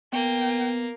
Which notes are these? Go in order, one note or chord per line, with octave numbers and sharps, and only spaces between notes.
A#3 B3 G5